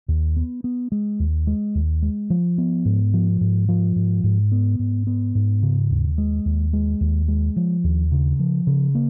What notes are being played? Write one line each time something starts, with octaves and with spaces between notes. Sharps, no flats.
D#2
B3
B3
G#3
D#2
G#3
D#2
G#3
F3
B3
G#2
F3
G#2
F3
G#2
G#2
B3
G#2
B3
G#2
C#3
D#2
G#3
D#2
G#3
D#2
G#3
F3
D#2
C#3
F3
C#3
A#3